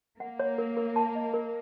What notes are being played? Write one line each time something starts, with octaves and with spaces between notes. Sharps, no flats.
A#3 F#5
C#5
A#4
A#4
A5
D#5
A#4